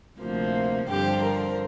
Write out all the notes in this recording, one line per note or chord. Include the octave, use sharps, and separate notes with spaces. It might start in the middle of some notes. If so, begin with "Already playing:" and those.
D2 C3 F3 A#3
G2 D3 F3 C4 G4
A#4